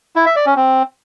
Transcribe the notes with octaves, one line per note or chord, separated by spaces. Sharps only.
E4
E5
D5
C#4
C4